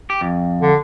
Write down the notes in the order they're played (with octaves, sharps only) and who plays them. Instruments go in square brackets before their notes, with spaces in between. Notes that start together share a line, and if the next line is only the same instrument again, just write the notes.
[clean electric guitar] G4
F2
[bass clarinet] D3